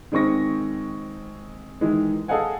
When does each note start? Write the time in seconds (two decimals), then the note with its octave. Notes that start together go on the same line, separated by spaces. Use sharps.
0.12 D#3 G#3 C4 C#6 A#6
1.81 D#3 E3 G#3
2.28 G#4 A4 D#5 F5 F#5 G#5